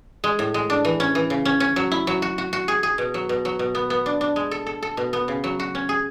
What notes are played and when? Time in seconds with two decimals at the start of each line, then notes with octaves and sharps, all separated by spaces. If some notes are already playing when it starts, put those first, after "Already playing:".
0.24 G#3
0.39 A2
0.54 G#3
0.70 D4
0.85 E3
1.00 C#4
1.15 E3
1.30 C#3
1.45 C#4
1.60 C#4
1.76 F#3
1.92 E4
2.07 F#3
2.22 F#4
2.38 F#4
2.53 F#4
2.68 G#4
2.83 G#4
2.98 B2
3.14 F#3
3.29 B2
3.45 F#3
3.59 B2
3.75 B3
3.90 B3
4.06 D4
4.21 D4
4.36 G#3
4.51 A4
4.67 A4
4.83 A4
4.97 B2
5.13 B3
5.28 C#3
5.44 F#3
5.60 F#4
5.75 C#4
5.89 G#4